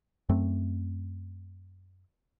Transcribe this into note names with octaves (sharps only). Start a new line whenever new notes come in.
F#2 A3 C4